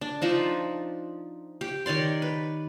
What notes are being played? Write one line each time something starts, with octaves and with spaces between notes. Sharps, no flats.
D4
F3 D4 D#4
G4
D#3 C#5 D5 C6
B4